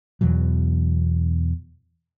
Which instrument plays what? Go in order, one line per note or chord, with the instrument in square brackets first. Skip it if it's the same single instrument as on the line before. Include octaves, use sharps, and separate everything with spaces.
[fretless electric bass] E2 B2 E3 F#3